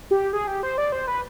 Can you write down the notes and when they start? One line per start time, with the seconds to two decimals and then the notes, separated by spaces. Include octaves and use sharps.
0.11 G4
0.33 G#4
0.48 G4
0.63 C5
0.78 D5
0.92 C5
1.07 B4